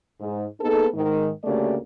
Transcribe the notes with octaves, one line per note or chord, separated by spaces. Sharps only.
G#2
A#3 B3 D#4 G#4 A4
G#2 D#3
D2 C#3 A3 A#3 G4 D5